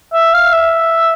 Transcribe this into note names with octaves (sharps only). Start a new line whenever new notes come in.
E5
F5
E5